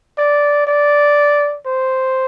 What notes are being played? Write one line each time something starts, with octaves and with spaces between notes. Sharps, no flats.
D5
D5
C5